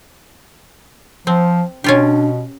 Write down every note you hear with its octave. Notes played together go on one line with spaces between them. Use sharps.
F3 C4
B2 C#4 D4 F4 G4